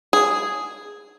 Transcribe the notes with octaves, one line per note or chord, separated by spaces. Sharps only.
G#4